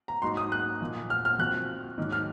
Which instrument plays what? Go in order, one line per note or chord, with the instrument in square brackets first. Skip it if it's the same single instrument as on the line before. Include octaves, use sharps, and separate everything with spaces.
[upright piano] A#5
[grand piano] G#2 F#3 A#3 D#4 F#4 [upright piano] C6
[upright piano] D#6
F#6
[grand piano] A#2 F3 A#3
[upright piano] F6
F6
[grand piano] F3 C4 F#4 [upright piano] F#6
[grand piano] G#2 D#3 F#3 A#3
[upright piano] F6